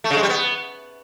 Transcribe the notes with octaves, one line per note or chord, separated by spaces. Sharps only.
A3
C#3
G#3
G3
B3